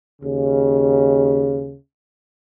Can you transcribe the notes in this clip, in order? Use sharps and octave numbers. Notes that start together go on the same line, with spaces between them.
D#2 C#3